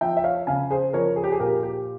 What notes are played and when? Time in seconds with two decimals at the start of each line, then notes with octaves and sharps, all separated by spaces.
0.01 F3 E5 G5
0.17 E5
0.24 C#5 F5
0.47 C#3 F5 G#5
0.70 G#4 C5
0.93 F3 A#4 C#5
1.16 G#4
1.24 G4
1.32 G#4
1.39 A#2 G4 A#4
1.63 G4